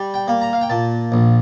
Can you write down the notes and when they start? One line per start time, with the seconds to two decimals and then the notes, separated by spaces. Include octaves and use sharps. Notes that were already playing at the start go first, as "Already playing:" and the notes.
Already playing: G3
0.14 G5
0.28 A#3
0.42 A#5
0.53 F5
0.61 G5
0.70 A#2 A5
1.12 A#1